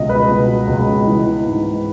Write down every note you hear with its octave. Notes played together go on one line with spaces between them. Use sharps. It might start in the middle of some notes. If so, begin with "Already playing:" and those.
Already playing: C#2 B2 D#5
B4
B2
C#2
E3
G#2